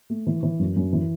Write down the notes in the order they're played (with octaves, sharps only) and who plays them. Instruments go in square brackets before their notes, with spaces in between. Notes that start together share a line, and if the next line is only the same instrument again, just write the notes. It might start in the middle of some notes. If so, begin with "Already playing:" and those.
[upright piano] A3
E3
E3
F#2
F#2
E3